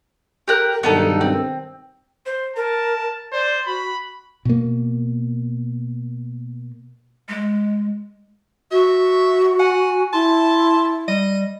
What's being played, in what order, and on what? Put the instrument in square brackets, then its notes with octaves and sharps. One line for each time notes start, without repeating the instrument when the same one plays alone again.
[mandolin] G4 A#4 F#6
[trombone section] B1 G2 D#3 [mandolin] B3 D#4 A4
[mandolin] C4
[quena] C5
[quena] A#4 [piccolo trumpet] A5
[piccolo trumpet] C5 [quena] D5
[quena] F#4 [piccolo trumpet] B5
[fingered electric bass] B2 A#3
[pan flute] G#3
[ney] F#4 [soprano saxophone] E5
[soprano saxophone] F#5 [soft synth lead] G#5
[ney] E4 [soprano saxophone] A5 [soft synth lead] C6
[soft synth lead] G3 [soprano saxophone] D#5